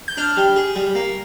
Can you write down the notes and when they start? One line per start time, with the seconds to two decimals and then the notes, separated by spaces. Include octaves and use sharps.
0.08 G6
0.17 D4 F6
0.37 G3
0.56 G#4
0.76 G3
0.95 A#3